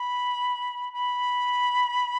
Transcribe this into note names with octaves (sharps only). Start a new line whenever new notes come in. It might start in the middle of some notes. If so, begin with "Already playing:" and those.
Already playing: B5
B5